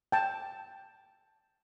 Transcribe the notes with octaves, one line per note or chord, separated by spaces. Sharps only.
G5 A5